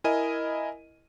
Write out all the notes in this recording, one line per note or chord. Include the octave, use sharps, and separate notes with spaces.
E4 A#4 D#5 G#5 D#7